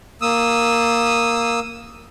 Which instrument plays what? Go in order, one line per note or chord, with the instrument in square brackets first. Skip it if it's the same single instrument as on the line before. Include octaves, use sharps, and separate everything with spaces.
[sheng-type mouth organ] A#3 D#6 E6